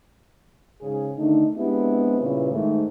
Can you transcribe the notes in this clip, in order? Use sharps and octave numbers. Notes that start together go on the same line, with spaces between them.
G#2 C#3 C#4 G#4
D3 D#3 A3 D4 D#4
G#3 B3 C4 D4 E4 G4
A#2 C#3 G3 E4 B4
G#2 D#3 A3